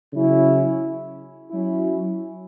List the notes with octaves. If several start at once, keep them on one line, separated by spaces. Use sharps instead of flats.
C#3 F#3 C#4 E4
F#3 C#4 E4